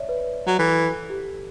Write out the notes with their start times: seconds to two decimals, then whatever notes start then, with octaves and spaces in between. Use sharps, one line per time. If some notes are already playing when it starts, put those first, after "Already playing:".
Already playing: C#5 D5 E5
0.09 B4
0.47 F#3
0.59 E3 A4
1.10 G4